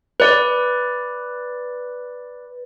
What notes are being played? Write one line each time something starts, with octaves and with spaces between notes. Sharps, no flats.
B4 D5